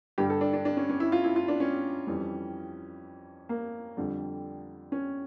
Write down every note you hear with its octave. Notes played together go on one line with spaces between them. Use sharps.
G2 D3 G3 G4
A4
D4
D4
D4
C#4
C#4
E4
F4
E4
F4
D4
C#4
F2 E3 G3
A#3
F2 D3 G3
C#4